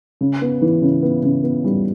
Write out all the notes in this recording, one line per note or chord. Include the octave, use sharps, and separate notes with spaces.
C#3
B3
E3
C#3
B3
C#3
B3
G3